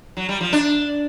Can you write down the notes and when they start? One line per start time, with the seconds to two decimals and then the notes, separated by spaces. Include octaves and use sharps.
0.17 F#3
0.29 G3
0.41 F3
0.53 D4